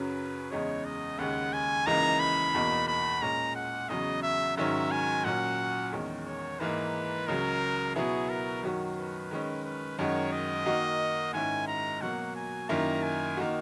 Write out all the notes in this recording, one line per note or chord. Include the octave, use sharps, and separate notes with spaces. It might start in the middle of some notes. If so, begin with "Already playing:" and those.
Already playing: F#2 C#3 F#3 C#4 B4
E2 C#3 G#3 D#4 C#5
D#5
D#2 C#3 G#3 F#5
G#5
C#2 C#3 E3 A#3 D#4 A#5
B5
E2 B2 A#3 D#4
B5
A#2 G#3 C#4 A#5
F#5
E2 C#3 F#3 D#5
E5
G#2 D#3 F#3 C#4 E5
G#5
A#2 F#3 C#4 F#5
E2 D#3 G#3 C#4
C#5
G#2 E3 A#3 D#4 B4
C#2 C#3 F#3 A#4
B2 F#3 B3 E4 G#4
A#4
F#2 D#3 F#3 C#4 F#4
B4
D#3 G#3 C#4
B4
F#2 D#3 G#3 D#4 F#4 C#5
D#5
D#3 A#3 D#4 F#4
G#2 D#3 G#3 C#4 E4 G#5
A#5
B2 F#3 A#3 F#5
G#5
F#2 D#3 A#3 E4 A#5
G#5
D#3 A#3 D#4 F#4